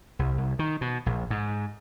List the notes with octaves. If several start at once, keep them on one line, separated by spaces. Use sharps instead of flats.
C2
C2
D#3
B2
A#1
G#2